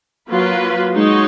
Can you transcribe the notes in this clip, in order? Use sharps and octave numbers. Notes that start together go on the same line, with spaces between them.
F#3 A#3 F4 B4
G#3 D#4 F#4 C#5